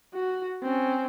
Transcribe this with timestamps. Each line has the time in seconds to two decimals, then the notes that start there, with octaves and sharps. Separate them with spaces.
0.14 F#4
0.63 C4 C#4